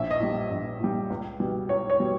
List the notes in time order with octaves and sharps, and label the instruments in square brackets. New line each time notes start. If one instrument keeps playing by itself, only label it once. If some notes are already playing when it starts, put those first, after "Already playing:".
Already playing: [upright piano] A#1 E5
D#5
A#2 G3
A#1
A#2 G3
C#2
B2 G3
C#2 C#5
C#5
B2 G3